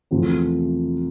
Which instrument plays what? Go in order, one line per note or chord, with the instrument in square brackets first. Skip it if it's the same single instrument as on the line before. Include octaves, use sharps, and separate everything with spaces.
[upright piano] E2 C3 F3 A3 C4